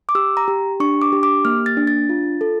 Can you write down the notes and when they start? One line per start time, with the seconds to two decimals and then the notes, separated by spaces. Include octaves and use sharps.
0.09 D6
0.15 G4 E6
0.37 A#5
0.48 G4
0.80 D4 C#6
1.02 D6
1.13 G4
1.23 D6
1.45 A#3 F6
1.66 A6
1.77 D4
1.87 A6
2.09 F4
2.41 A4